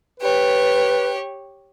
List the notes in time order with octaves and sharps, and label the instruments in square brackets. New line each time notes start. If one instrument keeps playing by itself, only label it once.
[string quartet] G4 C#5 [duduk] B4